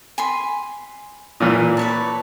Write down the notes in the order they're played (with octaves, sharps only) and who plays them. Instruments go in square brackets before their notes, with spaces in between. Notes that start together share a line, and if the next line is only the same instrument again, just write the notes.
[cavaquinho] G#5 B5 C6
[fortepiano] A#2 E3
[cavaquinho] B4 C#5 A5